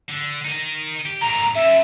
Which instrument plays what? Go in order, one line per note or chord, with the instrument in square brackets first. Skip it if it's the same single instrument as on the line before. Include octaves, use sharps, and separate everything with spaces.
[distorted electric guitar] D3
D#4 A#4
G4
[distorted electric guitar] A2 D#3 [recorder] A#5
[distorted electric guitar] F#2 [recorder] E5